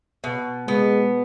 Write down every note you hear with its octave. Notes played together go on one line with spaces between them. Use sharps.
B2
G#3 B3